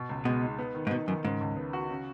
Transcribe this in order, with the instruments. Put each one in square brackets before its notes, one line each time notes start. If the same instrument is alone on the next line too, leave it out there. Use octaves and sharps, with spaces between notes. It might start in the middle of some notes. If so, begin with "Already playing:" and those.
Already playing: [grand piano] B2
C#2
[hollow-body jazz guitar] B2 [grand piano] G#3
[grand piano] D#4
B3
D#3
[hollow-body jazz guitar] G#2
[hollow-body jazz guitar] B2 [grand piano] D#4
[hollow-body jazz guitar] F#2 [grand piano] D#3
[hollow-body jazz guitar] G#2 [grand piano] C#3
[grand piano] C#2
B3
F#4
C#3